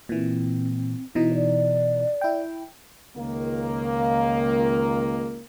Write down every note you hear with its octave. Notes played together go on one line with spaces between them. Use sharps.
A#2 E3 C4
B2 E3 D#4 E4
D5
E4 G5
C#2 D#3 A#3